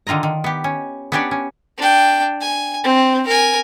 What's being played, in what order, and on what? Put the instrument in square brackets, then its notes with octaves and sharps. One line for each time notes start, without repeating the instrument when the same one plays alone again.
[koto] D3 D#3 F4 D#5 A#5
D#3
B3 G4
C#4
B3 C#4 D4 G4 C#5 D5
C#4
[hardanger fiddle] D4 G5
G#5
C4
A#4 G#5